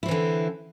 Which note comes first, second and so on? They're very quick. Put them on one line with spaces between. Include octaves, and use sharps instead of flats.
E4 C4 E3 D3